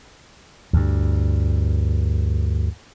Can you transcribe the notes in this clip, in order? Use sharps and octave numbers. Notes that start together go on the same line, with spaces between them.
D2 G2